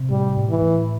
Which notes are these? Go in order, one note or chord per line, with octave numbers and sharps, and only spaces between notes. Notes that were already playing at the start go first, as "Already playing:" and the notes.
Already playing: C3
A2 G3
A2
E3
A2